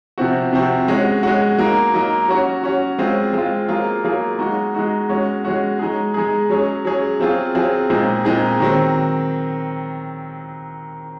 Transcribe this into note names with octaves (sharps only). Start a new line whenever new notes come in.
C3 F3 C4 F#4
C3 F3 C4 F#4
G#3 C#4 F#4
G#3 C#4 F#4
F#3 A#3 D#4
F#3 A#3 D#4
F#3 C#4 F#4
F#3 C#4 F#4
G#3 C4 F4
G#3 C4 F4
F#3 A#3 F4 G#4
F#3 A#3 F4 G#4
G#3 D#4 F#4
G#3 D#4 F#4
G#3 C#4 F#4
G#3 C#4 F#4
G#3 D#4 G#4
G#3 D#4 G#4
F#3 C#4 G#4
F#3 C#4 G#4
F#3 C4 F4 G#4
F#3 C4 F4 G#4
A#2 G#3 C4 D#4 G#4
A#2 G#3 C4 D#4 G#4
D#3 F#3 C4